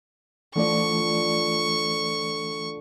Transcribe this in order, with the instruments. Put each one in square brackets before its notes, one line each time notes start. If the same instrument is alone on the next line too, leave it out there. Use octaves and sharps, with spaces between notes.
[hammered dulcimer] D3 F3 [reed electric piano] E3 A3 D5 [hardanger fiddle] C#6